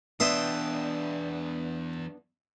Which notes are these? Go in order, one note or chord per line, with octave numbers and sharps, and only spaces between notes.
E2 B3 D4 E5 G5 C6 D#6